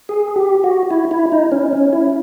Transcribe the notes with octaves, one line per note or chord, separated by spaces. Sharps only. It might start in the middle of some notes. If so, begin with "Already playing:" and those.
G#4
G4
F#4
E4
E4
D#4
C#4
C#4
E4